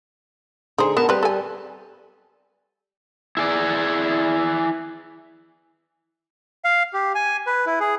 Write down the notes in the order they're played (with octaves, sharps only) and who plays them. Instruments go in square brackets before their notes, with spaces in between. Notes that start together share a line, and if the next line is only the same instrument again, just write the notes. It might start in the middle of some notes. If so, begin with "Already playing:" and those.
[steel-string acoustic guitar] D3 G#4 [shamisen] D#4 C5
[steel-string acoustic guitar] D3 A#4 A5 [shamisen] B3
[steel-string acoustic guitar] G3 [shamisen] C4 B4
[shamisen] A4 G#5
[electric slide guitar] E4 G#4 D5
[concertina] F5
G4
G#5
B4
E4
G#4